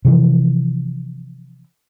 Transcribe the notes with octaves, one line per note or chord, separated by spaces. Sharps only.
C3 E3 F3